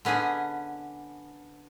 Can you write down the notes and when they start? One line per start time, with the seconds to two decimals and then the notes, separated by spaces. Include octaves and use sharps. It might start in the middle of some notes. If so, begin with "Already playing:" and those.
0.05 D3 B3 C#4 G#4 D#5